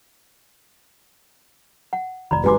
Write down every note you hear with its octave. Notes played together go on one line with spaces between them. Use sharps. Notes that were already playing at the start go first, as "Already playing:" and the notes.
F#5
F1 D5 A#5 B5
G#1 G3 F#4 B4 G#5 C6 D6